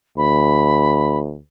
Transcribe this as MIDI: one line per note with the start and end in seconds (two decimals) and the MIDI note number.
0.17 1.39 38
0.17 1.18 83